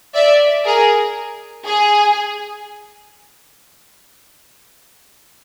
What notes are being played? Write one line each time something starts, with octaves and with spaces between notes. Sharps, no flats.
D5 E5
G#4 A#4
G#4